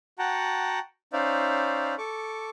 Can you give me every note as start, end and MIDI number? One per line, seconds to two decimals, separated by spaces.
0.19 0.79 66
0.19 0.79 78
0.19 0.79 79
0.19 0.79 81
0.19 0.79 82
1.13 1.95 61
1.13 1.95 63
1.13 1.95 72
1.13 1.95 74
1.13 1.95 76
1.13 1.95 77
1.98 2.50 69
1.98 2.50 85
1.98 2.50 86